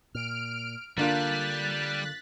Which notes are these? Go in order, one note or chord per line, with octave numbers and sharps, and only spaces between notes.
A#2 F6 D7
D3 G3 A#3 D4 F4 F#6 A6 B6